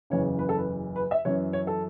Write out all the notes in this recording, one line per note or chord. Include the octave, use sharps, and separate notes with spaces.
F#1 E2 C#3 C#5
B4
A4
B4
B4
E5
F#2 E3 C#4 C#5
C#5
A4